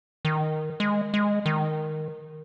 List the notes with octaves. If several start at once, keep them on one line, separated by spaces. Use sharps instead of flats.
D#3
G#3
G#3
D#3